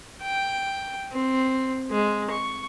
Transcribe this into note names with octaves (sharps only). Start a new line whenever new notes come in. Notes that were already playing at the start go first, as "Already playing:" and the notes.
G5
C4
G#3
C#6